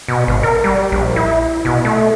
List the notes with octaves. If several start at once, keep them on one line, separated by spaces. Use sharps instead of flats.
B2
G#1
A#4
G3
A#1
E4
B2
A3